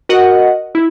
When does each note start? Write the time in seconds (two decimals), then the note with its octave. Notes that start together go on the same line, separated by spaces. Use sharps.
0.09 F#4 A#4 D#5 F#5
0.75 E4